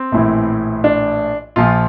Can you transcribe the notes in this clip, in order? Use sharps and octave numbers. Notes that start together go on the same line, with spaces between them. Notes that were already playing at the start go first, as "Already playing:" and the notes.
Already playing: C4
A#1 A2 E3
D4
A#1 A#2 F3 F4